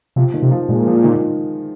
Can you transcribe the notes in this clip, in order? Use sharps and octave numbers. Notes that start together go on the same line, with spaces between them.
C3 F3
D#3
C3
F3
A#2 G#3
F3
D#3